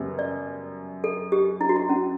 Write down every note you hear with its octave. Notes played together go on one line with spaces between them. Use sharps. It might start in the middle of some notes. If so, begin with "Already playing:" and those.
Already playing: F#2 C#3 G3 B3
D5
A4
G4
E4
F#4
E4
C#4